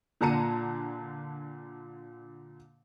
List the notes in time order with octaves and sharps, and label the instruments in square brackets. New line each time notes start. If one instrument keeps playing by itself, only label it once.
[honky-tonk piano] A#2 D3 A5 A#5 C#7 D#7